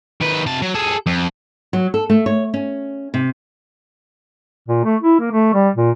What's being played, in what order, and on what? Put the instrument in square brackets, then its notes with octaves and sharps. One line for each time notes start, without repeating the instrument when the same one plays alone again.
[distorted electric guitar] D#3 B4
C3 A5
F#3
G#4 A4
F2
[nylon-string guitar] F#3
A4
A3
C#5
C#4
C3
[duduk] A#2
A3
E4
A#3
A3
G3
A#2